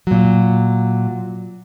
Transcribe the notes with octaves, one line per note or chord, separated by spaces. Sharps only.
A#2 F#3